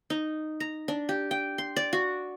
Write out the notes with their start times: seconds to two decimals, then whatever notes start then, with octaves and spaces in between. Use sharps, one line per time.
0.10 D#4
0.60 A#5
0.88 D4
1.09 G4
1.31 G5
1.58 C6
1.76 D5
1.93 F#4